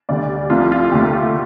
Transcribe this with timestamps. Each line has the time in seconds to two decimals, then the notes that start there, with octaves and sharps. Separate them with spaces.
0.09 D2 D3 G3 D5
0.50 C2 C3 F3 A3 F4
0.72 F4
0.92 D#2 D3 A3 G4
1.13 F4